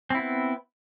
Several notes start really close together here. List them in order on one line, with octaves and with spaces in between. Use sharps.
C4 E4 B3